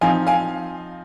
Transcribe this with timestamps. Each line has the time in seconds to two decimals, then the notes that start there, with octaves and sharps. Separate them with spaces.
0.01 F3 C4 D#4 F5 G#5
0.27 F5 G#5